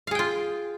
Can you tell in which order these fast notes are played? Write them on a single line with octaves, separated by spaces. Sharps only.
F5 G#4 G5 F4